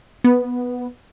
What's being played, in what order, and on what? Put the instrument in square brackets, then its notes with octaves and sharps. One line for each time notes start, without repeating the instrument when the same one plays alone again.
[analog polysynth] B3